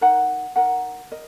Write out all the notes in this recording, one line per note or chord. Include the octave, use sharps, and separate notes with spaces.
D#4 A#4 F#5
D#4 A#4 F#5
A#4 D#5